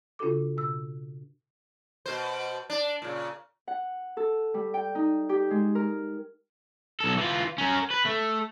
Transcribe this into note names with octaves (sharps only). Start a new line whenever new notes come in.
C#3 D4 F4 F#4 A4 D6
B2 E6
B2 C5
D4
A#2 C#3
F#5
A4
G3
G5
D#4
G4
G#3
A#4
B1 A4
E3 F4
C#4 A#4
B4
A3